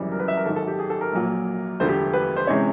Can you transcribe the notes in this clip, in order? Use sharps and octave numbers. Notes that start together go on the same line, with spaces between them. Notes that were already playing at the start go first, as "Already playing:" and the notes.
Already playing: G#1 F#2 C#3 E3 G3
A#4
B4
E5
A#4
G#1 G#2 D#3 F#3 A4
A4
G4
G#4
A4
A#4
A#1 A#2 F#3 A#3
E1 D2 D3 F3 A3 C5
G4
B4
C5
C3 E3 G#3 C#4 C#5